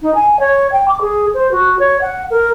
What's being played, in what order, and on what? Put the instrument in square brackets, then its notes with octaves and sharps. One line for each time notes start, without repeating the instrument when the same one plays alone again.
[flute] D#4
G#5
C#5
G5
D6
G#4
C5
F#4
C#5
F#5
A#4